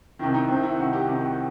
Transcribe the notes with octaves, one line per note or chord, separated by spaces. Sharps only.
C2 C3 D#3 E4
D#4
C2 C3 D#3 C4
E4
C2 C3 D#3 F#4
G4
C2 C3 D#3 G4
F#4